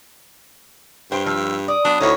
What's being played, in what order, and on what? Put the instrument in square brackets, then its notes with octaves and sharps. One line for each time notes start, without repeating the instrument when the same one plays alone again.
[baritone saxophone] G2 [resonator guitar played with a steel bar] C5 G5
[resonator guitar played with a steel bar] F3 [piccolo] E6
[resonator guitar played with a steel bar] D5 [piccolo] D#6
[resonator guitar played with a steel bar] F#3 B3 [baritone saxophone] D4
[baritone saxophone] D2 [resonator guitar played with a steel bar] D#4 E4 [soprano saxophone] C#5